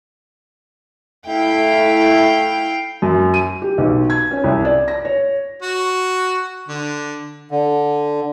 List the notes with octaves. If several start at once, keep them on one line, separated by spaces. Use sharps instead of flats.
A3 E4 F5 G5
F#2
D#7
G4
B1
G#6
C#4
C2
D5
A#6
C#5
F#4
D3
D3